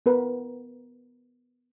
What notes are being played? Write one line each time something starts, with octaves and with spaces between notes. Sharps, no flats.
B3 A#4 B4